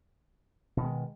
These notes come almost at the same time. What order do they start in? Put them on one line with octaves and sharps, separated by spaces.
B2 D#3 G#3